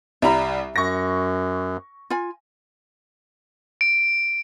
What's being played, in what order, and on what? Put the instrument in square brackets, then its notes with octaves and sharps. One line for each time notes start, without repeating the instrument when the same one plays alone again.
[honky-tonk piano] C2 G3 [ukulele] E5 A#5 B5
[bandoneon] F#2 [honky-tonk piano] C#6 A#6
[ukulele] F4 G#5
[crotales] D7